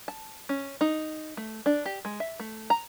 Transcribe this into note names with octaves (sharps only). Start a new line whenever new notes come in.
A5
C#4
D#4
A3
D4
G4
G#3
E5
A3
A#5